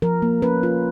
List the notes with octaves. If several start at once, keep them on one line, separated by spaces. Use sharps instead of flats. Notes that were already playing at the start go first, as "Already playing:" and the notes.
F3 A#4
A#3
C#4 B4
F4